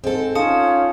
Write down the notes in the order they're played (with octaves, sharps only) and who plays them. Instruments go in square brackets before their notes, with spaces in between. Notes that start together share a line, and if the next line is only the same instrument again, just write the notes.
[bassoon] G#2 [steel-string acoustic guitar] C4 A4
[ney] C#4 [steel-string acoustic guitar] D#4 [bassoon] F4 [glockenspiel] A5 D#6 C#7